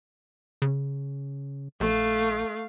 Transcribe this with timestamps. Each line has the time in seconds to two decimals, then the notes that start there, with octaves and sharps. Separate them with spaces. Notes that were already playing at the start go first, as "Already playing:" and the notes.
0.62 C#3
1.80 A#1 A3 F5